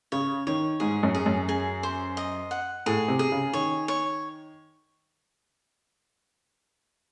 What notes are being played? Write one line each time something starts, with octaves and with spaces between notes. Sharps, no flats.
C#3 C#5
D#3 C#5
G#2 G#4
F#2
G#4
F#2
G#4
C5
D#5
F#5
A2 G#4
C3
G#4
C#3
D#3 C#5
C#5